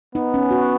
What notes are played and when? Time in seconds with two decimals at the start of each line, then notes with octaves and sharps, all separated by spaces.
0.15 B3 D#4
0.34 C#4
0.51 F#4